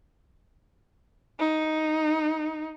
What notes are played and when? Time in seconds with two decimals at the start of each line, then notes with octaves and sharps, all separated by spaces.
1.40 D#4